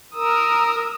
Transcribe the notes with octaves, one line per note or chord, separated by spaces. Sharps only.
A#4 D#6 E6